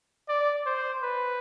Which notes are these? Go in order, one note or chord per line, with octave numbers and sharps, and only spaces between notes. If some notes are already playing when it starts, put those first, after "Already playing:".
D5
C5
B4